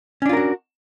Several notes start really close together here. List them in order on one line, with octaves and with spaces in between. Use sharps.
C#4 D4 F4 A#4 F#4